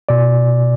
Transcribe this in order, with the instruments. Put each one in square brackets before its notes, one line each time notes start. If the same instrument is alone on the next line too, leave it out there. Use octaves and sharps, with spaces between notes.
[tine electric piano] B2 D5